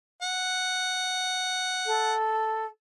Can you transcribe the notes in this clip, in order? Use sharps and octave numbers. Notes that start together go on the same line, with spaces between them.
F#5
A4